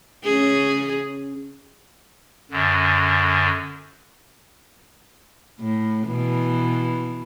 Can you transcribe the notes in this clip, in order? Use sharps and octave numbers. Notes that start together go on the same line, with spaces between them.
C#3 C#4 G#4
F#2 D3
A2
B2 E3